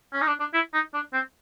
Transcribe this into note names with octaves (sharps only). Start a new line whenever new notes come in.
C#4
D#4
D4
D4
E4
D#4
D4
C4